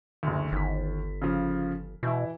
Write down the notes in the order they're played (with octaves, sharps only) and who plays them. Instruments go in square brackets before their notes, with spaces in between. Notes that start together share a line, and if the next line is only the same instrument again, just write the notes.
[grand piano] F#1 D2
[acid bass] G1 [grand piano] D#2 B6
[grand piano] C#3 F3
[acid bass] B2 [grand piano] E3 E4